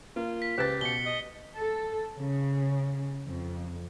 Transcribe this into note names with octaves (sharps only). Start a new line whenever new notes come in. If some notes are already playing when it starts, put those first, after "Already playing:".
A#3 F4
B6
C#2 G4 B4 C5 A6
B2 C#7 G7
D#5
A4
C#3
F2